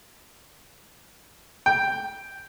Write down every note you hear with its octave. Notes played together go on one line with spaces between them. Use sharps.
G5